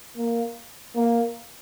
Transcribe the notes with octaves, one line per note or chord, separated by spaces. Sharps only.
A#3
A#3